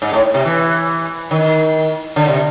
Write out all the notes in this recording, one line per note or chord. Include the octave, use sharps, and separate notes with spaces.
G#2
A2
C3
E3
D#3
D3
C3